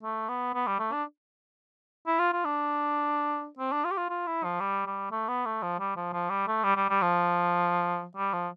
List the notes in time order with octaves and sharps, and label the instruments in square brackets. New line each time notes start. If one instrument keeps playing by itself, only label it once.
[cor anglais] A3
B3
B3
G3
A3
D4
E4
F4
F4
D4
C4
D4
F4
G4
F4
F4
E4
F3
G3
G3
A3
B3
A3
F3
G3
F3
F3
G3
A3
G3
G3
G3
F3
G3
F3